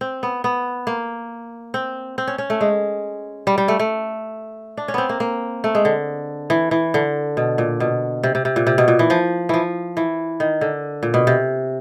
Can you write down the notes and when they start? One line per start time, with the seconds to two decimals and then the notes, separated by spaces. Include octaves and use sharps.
0.01 C4
0.23 B3
0.44 B3
0.87 A#3
1.74 C4
2.18 C4
2.27 C#4
2.38 C#4
2.50 A3
2.61 G#3
3.47 G3
3.58 G3
3.68 A3
3.79 A3
4.77 D4
4.88 C#4
4.94 B3 C4
5.09 A#3
5.20 A#3
5.64 A3
5.75 G#3
5.85 D3
6.50 E3
6.71 E3
6.94 D3
7.37 B2
7.58 A#2
7.80 B2
8.23 C3
8.35 C3
8.45 C3
8.56 A#2
8.67 C3
8.78 B2
8.88 A#2
8.99 E3
9.10 F3
9.49 E3 F3
9.97 E3
10.40 D#3
10.61 D3
11.03 A#2
11.14 B2
11.27 C3